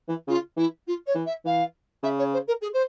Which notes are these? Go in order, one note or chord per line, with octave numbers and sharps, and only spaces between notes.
E3
C#3 F4
E3 E4
F4
C#5
E3
E5
E3 F5
C#3 E5
C#5
C5
A#4
G#4
C5